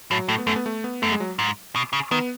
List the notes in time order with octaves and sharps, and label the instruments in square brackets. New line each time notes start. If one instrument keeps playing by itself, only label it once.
[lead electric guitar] A2 [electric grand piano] F#3
[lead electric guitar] A2 [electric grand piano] A3
[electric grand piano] B3
[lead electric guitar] F#2 [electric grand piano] A3
[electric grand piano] B3
A3
B3
[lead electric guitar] F#2 [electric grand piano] A3
[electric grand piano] G#3
F#3
[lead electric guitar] G#2
B2
C#3
[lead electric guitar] D#3 [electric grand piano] B3